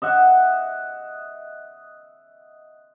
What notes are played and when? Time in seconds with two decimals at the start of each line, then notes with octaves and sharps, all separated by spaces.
0.02 D#5 E5 F#5